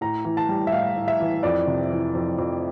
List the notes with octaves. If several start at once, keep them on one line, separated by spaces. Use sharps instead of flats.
A2 A#5
E3
A5
G3
E5
A2 F5
A2
E5
E3
F2 D5
C3
E3
F2
F2